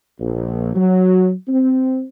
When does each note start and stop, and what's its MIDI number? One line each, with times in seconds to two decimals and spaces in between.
0.20 0.75 34
0.75 1.32 54
1.48 2.07 60